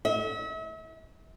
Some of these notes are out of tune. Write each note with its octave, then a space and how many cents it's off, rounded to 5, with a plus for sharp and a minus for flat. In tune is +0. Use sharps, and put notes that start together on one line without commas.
E5 -40